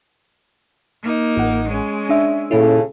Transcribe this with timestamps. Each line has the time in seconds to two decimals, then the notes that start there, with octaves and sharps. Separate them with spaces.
1.02 A#3 D#4
1.36 A1 F#5
1.69 G#3 C#4
2.09 D4 E5
2.51 D#2 A#2 C#3 C#4 E4 A4